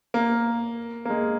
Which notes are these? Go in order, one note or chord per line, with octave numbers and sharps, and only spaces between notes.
A#3
A#3
G#3